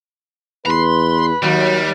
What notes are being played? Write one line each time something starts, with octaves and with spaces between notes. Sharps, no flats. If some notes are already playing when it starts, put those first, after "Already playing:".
E2 B4 A#5 C6
D#2 F#3 G3